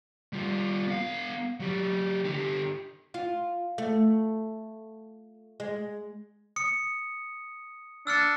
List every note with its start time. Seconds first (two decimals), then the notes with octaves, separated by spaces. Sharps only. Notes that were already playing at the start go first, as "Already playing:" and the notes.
0.33 G3 F4
0.87 B3 F5
1.60 F#3 G4
2.25 D3 G4
3.14 F4
3.78 A3
5.60 G#3
6.56 D#6 C#7
8.07 D4 E6 F6 C#7